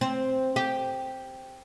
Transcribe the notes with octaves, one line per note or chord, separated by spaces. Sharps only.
C4
G4